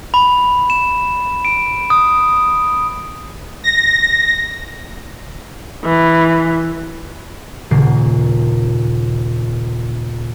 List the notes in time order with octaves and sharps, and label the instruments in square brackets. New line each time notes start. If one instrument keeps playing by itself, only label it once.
[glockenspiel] B5
E7
D7
D#6
[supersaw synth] A#6
[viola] E3
[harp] D#1 A#2 C#3 C7